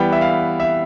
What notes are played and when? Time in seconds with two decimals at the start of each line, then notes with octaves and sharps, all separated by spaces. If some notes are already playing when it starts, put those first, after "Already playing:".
Already playing: E3 G3 B3 G5
0.12 E5
0.21 F5
0.60 E5